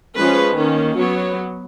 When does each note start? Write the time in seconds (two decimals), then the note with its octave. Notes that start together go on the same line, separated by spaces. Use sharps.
0.15 F3 G#3 C#4 B4
0.56 D#3 A#3 C#4
0.97 F#3 B3 C#5